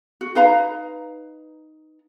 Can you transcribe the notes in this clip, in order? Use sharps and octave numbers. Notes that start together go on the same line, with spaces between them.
F#4
D#4 B4 F5 A#5